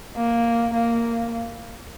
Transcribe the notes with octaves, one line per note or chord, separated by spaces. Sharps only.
A#3
A#3